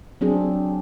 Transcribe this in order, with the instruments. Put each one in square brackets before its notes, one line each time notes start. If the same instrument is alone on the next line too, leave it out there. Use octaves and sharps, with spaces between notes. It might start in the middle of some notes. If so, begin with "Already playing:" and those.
[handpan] F#3 C4 D4 G#4